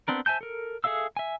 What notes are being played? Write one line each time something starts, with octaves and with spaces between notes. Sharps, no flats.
B3 C4 D4 A#4
C5 E5 G#5 A5 G6
A4 A#4
G#4 A4 E5 F5 E6
E5 G#5